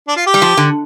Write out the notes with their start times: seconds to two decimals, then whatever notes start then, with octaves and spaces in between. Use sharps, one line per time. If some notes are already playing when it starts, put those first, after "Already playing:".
0.08 D4
0.16 F4
0.26 G4
0.34 G3
0.42 F3
0.57 D3